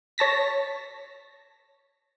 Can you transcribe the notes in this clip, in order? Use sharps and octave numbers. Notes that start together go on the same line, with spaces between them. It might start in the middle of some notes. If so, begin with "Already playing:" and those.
C#5 A5 A#6 B6